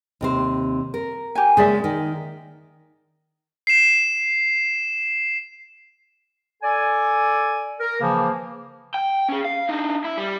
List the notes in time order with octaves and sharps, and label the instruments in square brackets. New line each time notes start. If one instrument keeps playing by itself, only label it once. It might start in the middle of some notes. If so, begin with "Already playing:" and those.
[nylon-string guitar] D#2 C3 C5
A#4
[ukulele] G4 G#5
[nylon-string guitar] C#3 G#3 A#3 [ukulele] G#4 D5 E5
[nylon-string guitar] D#3
[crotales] C7 E7
[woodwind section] A4 D5 G#5
A#4
C#3 E3 F3 A#3
[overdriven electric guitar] G5
C#4 G#4
F5
D4 D#4
E4
G3